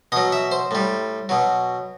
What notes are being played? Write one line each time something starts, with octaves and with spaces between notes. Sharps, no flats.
B2 F#3 D#5
E5
C5
A2 G3
B2 F#3